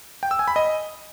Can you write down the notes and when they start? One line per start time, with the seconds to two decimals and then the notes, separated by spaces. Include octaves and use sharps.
0.23 G5
0.31 E6
0.39 G#5
0.48 B5
0.56 D#5